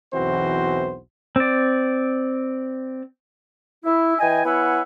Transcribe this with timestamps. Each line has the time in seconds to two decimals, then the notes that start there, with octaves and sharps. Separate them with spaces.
0.13 B1 E2 E3 C4 F#4 C5
1.36 C4 D5
3.85 E4
4.20 E3 D#5 G5 G#5
4.45 B3 E4 C#5 E5 F#5 G#5